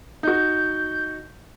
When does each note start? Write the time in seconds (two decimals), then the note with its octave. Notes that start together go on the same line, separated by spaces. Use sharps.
0.23 D#4 F#4 G6